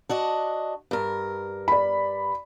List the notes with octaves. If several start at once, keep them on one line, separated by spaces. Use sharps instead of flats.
D4 F#4 D#5
G2 A#4
D5 B5